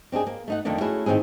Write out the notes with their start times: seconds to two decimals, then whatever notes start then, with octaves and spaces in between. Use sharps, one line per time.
0.12 C4 D4 D#4 G#4
0.26 A#3
0.48 A3 D#4 F#5
0.65 F2 D3 D#3 A3 A#3 D4
0.81 A3 C#4 E4 F#4 G#4
1.06 A2 D#3 F#3 C4 G#4